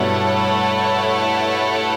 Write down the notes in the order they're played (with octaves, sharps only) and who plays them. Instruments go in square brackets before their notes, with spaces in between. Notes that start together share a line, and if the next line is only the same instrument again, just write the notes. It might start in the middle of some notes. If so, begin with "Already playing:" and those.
Already playing: [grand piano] G2 B2 [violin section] A3 E4 A4 C#5 F#5